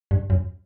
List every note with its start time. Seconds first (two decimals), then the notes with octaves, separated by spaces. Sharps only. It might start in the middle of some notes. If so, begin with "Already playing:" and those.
0.11 G2
0.30 F#2